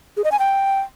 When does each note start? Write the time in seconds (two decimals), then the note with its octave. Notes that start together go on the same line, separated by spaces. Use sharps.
0.17 G#4
0.24 D#5
0.32 G#5
0.39 G5